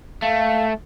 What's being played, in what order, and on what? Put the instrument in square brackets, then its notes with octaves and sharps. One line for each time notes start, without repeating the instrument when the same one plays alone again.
[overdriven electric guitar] A3 [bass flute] F5